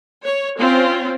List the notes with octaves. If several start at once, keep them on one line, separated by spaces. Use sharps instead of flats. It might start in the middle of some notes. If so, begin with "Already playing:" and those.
C#5
C4 C#4 F4